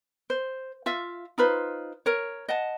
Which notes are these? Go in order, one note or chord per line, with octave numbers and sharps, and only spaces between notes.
C5
F4 E5 F5
D#4 F4 B4 C5
A#4 C#5
D#5 F#5 A5